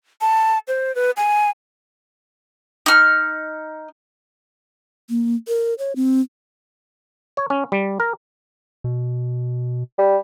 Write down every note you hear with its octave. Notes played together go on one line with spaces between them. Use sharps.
A5
C5
B4
G#5
D#4 F6
A#3
A#4
C#5
C4
C#5
C#4
G3
A#4
B2
G3